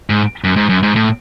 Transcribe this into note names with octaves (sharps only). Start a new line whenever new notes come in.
G#2
F#2
G#2
F#2
G#2
A2